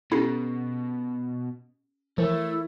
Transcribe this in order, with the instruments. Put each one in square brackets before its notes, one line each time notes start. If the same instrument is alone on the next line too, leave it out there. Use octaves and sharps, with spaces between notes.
[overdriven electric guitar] B2 [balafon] C#4 G4 A4 [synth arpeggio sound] E4 C7
[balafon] E3 A#4 [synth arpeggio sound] F3 [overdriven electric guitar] A3 [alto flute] E4